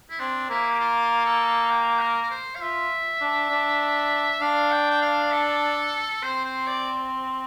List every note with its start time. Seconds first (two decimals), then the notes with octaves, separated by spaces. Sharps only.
0.10 E4
0.20 C4 D4
0.50 A#3 E4
0.71 G4
0.80 F4
1.25 A4
1.70 G5
2.00 A#4
2.22 A#4
2.31 C5
2.55 F5
2.61 F4 E5
3.21 D4
3.50 D4
4.41 D4 F5
4.71 G5
4.91 G5
5.02 F5
5.32 A4
6.23 C4 C5
6.45 C5
6.67 D5